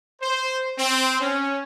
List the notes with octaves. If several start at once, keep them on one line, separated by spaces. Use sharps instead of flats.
C5
C4
C#4